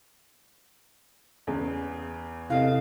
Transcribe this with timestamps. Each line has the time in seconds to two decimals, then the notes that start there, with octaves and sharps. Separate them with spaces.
1.47 E2 C#3
2.50 C3 E4 A4 D#5 F5